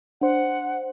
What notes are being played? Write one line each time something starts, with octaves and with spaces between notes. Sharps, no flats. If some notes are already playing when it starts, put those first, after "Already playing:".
D4 C5 F#5